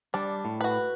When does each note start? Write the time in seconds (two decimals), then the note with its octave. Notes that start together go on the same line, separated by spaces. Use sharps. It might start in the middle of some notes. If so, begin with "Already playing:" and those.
0.14 G3 D4
0.45 A2
0.61 F#4 B4